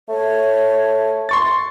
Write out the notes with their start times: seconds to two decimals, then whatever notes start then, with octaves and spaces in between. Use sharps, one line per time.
0.09 A3 C#5
1.29 C6 C#6 A6